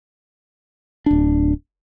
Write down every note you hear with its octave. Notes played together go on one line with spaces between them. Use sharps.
D1 D4